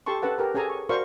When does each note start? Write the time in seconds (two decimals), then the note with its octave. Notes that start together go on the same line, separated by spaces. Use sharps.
0.06 G4 A4 A5 C6 C#6
0.22 C#4 A4 B4 F#5 A5
0.38 G4 A#4 B4
0.54 C#4 G#4 A4 G#5 A#5
0.70 C#6
0.89 F#4 A#4 C5 D5 F5 C#6